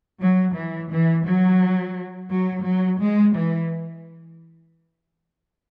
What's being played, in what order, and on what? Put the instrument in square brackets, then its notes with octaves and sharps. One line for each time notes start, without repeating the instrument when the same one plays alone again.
[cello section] F#3
E3
E3
F#3
F#3
F#3
G#3
E3